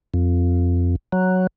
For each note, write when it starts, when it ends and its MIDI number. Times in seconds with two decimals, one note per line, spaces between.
0.14 0.96 41
1.12 1.47 54